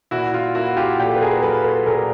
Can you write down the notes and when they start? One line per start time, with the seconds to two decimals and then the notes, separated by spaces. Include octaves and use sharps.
0.11 A#2 E4 F#4
0.34 F4
0.55 A#3 E4 F#4
0.77 F4 G4
0.98 A#2 G4 A4
1.16 B4
1.21 G#4 A#4
1.42 F#3 A4 B4
1.64 A4 B4
1.86 A#2 G#4 A#4